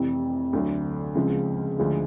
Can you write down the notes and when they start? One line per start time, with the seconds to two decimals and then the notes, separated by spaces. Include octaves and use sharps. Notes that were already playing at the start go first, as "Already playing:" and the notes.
Already playing: F1 F2 C3 E3
0.53 D2 D3 F#3
1.15 C#2 C#3 F3 G#3 C4
1.78 D2 D3 F3 G#3